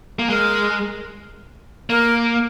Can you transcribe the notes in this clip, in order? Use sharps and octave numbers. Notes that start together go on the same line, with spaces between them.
A#3
G#3 A#4
A#3 A#4